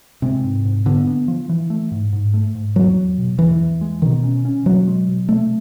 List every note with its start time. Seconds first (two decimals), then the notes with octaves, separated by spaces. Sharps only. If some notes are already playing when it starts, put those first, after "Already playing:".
0.22 C3 G#3
0.44 G#2
0.65 G#2
0.86 D3 B3
1.07 B3
1.28 F3
1.49 E3
1.70 A3
1.91 G#2
2.13 G#2
2.34 A3
2.55 G#2
2.76 E2 F#3
2.97 E2
3.18 B2
3.39 E2 E3
3.60 E2
3.81 G#3
4.02 B2 D#3
4.23 C#4
4.45 C#4
4.66 B2 F#3
4.87 G#3
5.08 B2
5.29 C3 A3